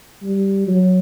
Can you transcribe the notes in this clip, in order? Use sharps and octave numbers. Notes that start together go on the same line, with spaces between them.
G3
F#3